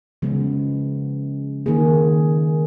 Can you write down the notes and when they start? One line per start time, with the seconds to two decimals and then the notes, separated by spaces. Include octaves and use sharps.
0.22 C#3 F3 G#3 B3
1.66 D#3 A#3 G#4